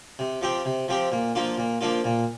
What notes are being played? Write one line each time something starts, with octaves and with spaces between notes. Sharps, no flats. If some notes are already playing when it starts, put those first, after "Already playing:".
C3
F3 C4 G4
C3
F3 C4 G4
A#2
F3 A#3 D4 F4
A#2
F3 A#3 D4 F4
A#2